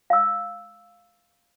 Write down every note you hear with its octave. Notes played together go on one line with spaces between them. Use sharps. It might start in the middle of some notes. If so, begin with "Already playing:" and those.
F5 E6